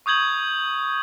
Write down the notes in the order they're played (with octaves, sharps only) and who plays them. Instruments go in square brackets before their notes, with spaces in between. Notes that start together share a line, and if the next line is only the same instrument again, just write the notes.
[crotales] C#6 D#6 G6 G#6 F#7